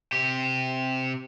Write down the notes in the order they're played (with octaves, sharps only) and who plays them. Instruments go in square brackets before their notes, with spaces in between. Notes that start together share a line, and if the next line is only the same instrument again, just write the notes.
[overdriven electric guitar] C3 G4